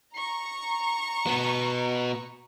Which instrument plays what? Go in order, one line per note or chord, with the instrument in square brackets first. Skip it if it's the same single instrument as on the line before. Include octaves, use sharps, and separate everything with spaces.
[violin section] A#5 C#6
[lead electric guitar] B2 B3